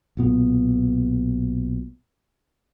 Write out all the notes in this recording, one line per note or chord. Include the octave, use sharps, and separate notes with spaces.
B1 A#2 B3